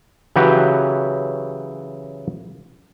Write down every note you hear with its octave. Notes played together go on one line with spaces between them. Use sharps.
C#3 E3 F#3 F#4 G4 B4